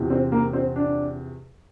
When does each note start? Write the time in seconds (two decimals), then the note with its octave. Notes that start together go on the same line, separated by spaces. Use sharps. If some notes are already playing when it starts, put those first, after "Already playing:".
Already playing: E2 C3 F3
0.10 C4
0.32 A#3
0.53 C4
0.76 D4